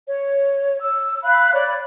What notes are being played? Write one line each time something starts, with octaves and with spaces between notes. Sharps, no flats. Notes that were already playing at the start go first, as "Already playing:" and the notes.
C#5
E6
F5 B5 F#6
C#5 D5 B5